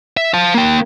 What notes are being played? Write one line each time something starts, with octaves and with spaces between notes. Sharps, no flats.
E5
F5 A5
A#3 G5